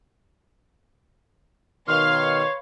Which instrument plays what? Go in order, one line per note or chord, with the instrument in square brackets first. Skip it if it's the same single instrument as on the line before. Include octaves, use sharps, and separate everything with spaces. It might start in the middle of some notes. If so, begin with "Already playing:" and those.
[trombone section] B2 D#3 [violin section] B4 F5 C6 [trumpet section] C#5 [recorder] F6